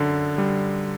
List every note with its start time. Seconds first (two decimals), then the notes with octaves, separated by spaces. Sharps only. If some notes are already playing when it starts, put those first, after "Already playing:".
Already playing: F#2 D3
0.38 G3